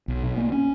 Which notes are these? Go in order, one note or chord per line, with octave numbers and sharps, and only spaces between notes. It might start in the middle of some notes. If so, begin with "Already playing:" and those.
B1
B2
A#3
C#4